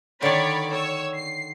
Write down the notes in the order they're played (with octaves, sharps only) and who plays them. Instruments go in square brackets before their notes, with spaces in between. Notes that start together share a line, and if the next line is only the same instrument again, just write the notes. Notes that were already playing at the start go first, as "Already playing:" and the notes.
[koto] D3 D#3 [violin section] C#5 D5 B5
[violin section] C#5 E6
C7